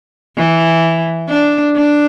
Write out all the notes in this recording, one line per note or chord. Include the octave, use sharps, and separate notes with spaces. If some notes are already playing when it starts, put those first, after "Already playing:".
E3
D4
D4